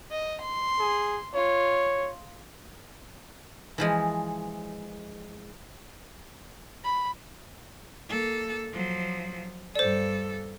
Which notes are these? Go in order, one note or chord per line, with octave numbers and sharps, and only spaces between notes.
D#5
C6
G#4
F4 C#5
E3 F3 G#3
B5
A#3 A4
F3 F#3
G2 A4 C5 D5